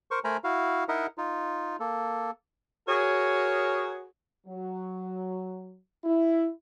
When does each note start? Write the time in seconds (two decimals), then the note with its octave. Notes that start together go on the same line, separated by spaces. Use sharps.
0.11 A#4 C5 C#6
0.24 A3 A#4 C5 G#5 A#5 B5
0.44 E4 F#4 F5
0.89 D#4 E4 A#4 D#5 E5 F#5
1.18 D#4 F4
1.80 A#3 A4
2.88 F#4 G#4 A#4 C#5
4.47 F#3
6.04 E4